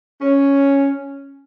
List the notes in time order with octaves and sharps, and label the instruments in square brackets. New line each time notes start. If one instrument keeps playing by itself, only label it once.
[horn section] C#4